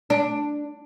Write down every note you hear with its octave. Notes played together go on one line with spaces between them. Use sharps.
D4